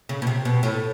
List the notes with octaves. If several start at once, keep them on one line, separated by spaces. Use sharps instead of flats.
C#3
B2
C3
B2
A2